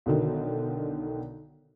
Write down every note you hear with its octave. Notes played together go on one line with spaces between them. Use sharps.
B1 D3 D#3